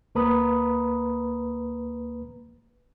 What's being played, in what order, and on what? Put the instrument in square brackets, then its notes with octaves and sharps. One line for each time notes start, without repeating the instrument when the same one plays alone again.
[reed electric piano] D2 A#3 B4 A#5 B5 D#6